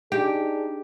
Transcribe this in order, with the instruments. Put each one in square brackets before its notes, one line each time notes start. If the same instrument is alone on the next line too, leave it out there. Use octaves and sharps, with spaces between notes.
[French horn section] D4 D#4 G#4 [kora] G4